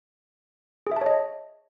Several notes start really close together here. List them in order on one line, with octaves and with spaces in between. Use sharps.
G#4 E5 A5 C#5 D#5